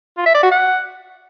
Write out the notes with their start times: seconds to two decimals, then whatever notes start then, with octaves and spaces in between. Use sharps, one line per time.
0.18 F4
0.26 E5
0.34 D5
0.43 F#4
0.51 F#5